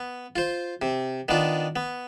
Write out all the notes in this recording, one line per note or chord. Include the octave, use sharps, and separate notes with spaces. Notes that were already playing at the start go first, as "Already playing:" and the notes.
Already playing: B3
F4 C5
C3
D#3 B3 D4 F4
B3